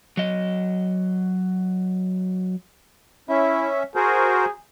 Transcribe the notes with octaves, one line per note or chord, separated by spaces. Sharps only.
F#3 D#5
C#4 E4 E5
F#4 G#4 A#4 C5